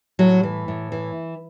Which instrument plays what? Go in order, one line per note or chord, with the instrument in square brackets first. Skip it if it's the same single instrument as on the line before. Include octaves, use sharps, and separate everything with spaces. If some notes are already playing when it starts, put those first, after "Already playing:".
[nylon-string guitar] A2 F#3
E3
A2
E3